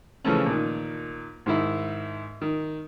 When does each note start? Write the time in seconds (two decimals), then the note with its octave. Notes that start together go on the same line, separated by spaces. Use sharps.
0.25 C#3 E3 F3 A3 C#4
0.46 A#2 D#3
1.46 G#2 D#3 E4
2.41 D#3